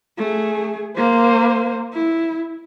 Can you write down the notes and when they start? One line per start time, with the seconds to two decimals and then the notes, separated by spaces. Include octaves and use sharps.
0.18 A3 G#4
0.97 A#3 C5
1.93 E4